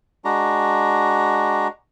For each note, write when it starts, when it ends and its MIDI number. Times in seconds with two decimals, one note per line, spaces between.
0.25 1.68 56
0.25 1.68 62
0.25 1.68 66
0.25 1.68 82